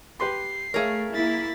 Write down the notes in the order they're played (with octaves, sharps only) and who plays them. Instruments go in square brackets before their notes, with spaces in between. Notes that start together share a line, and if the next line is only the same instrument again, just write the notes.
[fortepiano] G4 B4 C6 [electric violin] C7
[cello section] A3 [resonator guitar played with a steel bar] G#4 A#4 [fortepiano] C#5 E5 F5
[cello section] A#3 E4 [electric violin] A6 B6